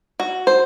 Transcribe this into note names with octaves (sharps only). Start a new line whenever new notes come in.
F#4
C5